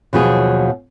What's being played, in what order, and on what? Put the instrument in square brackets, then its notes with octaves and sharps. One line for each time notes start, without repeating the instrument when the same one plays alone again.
[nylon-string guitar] D#2 B2 F3 F#3 G#4